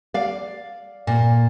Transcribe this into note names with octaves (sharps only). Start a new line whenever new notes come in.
D5 F5
A#2